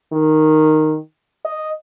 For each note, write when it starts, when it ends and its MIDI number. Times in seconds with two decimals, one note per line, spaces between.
0.13 0.97 51
1.45 1.71 75